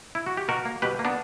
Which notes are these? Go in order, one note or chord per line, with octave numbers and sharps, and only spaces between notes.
E4
F#4
G4
B2 F#4 A#4
A#3
B2 G4 B4
A#3
B3 D4